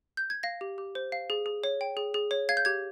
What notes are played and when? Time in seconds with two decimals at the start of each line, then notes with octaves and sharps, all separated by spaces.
0.17 G6
0.30 G#6
0.43 F5 A#6
0.61 G4
0.78 G4
0.95 C5
1.12 F5
1.30 G#4
1.46 G#4
1.64 C#5
1.81 G5
1.97 G#4
2.14 G#4
2.31 C#5
2.49 F5 G#6
2.57 G6
2.65 G4 G#6